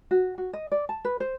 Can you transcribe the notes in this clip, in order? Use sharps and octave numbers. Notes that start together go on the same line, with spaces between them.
F#4
F#4
D#5
D5
A5
B4
C5